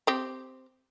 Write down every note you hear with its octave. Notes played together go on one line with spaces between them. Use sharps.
C4 G4